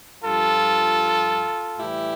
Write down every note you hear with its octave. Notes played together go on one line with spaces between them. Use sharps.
G2 F3 F4 A4
A2 E3 G3 E4 G4